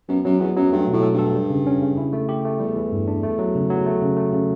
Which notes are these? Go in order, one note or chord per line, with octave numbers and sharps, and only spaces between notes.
F#2 B3
F#2 F#3
E2 B3
F#2 F#3
G2 A3
B2
A2
A4
G2 A4
G3
C#3
C#4
C#3
E4
A3
G4
A3
E2 G3
E3
G2
D4
A3
F#3
C#3
F#3
A3
C#3
A3
C#3